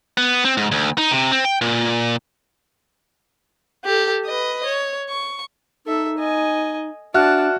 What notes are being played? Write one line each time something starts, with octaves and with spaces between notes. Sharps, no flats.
B3
C4
G#2
D2
D#4
C3
C4
G5
A#2
G4 A4
B4 D#5
C#5
C#6
D#4 A4 E5
D#5 G#5
D4 F#4 D5 E5 A5 F6 F#6